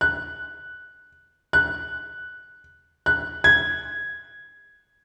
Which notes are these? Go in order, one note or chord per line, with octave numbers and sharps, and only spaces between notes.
F#6
F#6
F#6
G#6